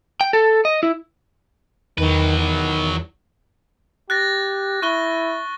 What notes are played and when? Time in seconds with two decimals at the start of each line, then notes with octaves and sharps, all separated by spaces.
0.21 G5
0.33 A4
0.65 D#5
0.83 E4
1.98 E2 D#3 F#3 B4
2.39 D#3
4.10 G4 F#6 A6 A#6
4.82 E4 C#6 F#6 G7